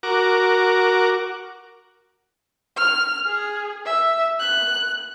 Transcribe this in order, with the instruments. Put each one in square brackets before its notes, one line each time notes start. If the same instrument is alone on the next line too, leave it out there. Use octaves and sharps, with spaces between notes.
[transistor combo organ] F#4 A#4 D6
[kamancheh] F6
G#4
E5
F#6